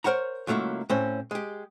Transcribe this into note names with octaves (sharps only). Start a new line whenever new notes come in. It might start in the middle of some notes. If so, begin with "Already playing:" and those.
A#4 C5 C#5 F#5 A#5
C#2 F#3 A3 A#3 E4
A2 C4 C#4
G#3 G4